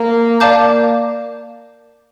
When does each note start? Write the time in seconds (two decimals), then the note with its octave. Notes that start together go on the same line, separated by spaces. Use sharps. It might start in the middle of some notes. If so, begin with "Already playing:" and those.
Already playing: A#3
0.40 A#3 D5 F5 A5 D6 G6